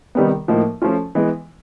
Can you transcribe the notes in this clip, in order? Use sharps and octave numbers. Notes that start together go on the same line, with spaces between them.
C3 D#3 G3 B3
A2 F3 A#3 D#4
F3 A3 C#4 F4
E3 G#3 B3